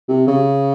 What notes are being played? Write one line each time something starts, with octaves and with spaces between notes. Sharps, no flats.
C3
C#3